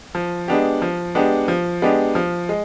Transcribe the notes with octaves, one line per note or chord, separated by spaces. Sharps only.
F3
G#3 B3 D4 G4
F3
G#3 B3 D4 G4
F3
G#3 B3 D4 G4
F3
G#3